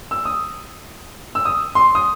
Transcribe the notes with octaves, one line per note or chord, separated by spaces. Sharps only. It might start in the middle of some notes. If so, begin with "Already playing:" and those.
E6
D#6
E6
D#6
C6
D#6